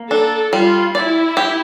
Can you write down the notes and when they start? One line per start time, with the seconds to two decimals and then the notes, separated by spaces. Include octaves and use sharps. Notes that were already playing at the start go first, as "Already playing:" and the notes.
Already playing: A#3
0.10 D4 A4
0.53 G3 F4
0.94 E4 D5
1.37 G4